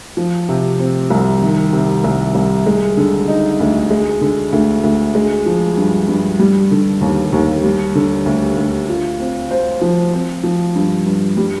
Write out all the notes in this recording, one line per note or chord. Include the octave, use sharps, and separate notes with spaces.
F3
C3
C4
C2
D#3
C3
C2
C2
G#3
D3
D#4
D2
G#3
D3
D2
D2
G#3
F3
G2
G2
G3
D3
D#2
D#2
G3
D3
D2
D2
F4
C4
C5
F3
C4
F3
G2
G2
G3